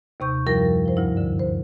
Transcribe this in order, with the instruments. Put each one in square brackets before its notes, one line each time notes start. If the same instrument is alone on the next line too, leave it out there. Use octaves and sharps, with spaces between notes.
[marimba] D#2 C3 C#6 G6
F#2 F3 G3 E4 A#4 A#6
F3 C5
D2 G2 E4
D3
C5